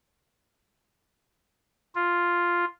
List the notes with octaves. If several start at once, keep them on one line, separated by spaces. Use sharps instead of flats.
F4